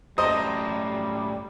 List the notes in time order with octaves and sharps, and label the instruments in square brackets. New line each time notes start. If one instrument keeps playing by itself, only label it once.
[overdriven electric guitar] F#2 A2 [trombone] G3 [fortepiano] C5 D#5 [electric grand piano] A#5